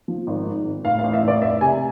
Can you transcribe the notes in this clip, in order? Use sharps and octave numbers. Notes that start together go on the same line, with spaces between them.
F3
G#1
G#2
G#1
A2 F5
A1 F5
E5
A2 D5
F1 E5
C3 G#5